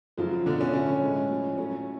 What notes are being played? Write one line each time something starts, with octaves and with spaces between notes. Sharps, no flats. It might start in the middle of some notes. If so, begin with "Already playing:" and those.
F#2 C#3 F3 A3 F4
B2 D3 A3 D4
C#4
A2 F3 A3 C#4
A2 G#3
A2 F3 A3
A2 F#3 A3 C#4